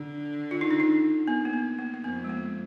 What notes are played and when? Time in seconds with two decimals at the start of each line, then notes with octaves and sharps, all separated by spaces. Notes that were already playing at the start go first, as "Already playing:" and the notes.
Already playing: D3 D4
0.51 F4
0.61 D#4
0.71 D4
0.80 D#4
1.28 B3
1.45 A#3
1.53 B3
1.79 A#3
1.94 A#3
2.04 F2 B3
2.24 G#3
2.29 A#3